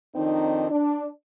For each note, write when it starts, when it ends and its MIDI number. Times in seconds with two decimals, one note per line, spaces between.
0.14 0.66 41
0.14 0.66 51
0.14 0.66 60
0.14 0.66 62
0.14 0.66 63
0.69 1.06 62